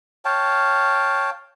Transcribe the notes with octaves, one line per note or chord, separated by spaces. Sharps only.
C#5 F5 G5 A5